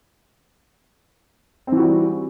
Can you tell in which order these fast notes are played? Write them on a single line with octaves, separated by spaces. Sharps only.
C4 E3 F#4 G3